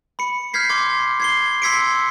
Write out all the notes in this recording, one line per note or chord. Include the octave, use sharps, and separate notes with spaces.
B5 C#7
F6 G6 G#6 B6 C7
C6 D6 G#6
G#6 C7 G7
C6 E6 G#6 B6 C#7 D7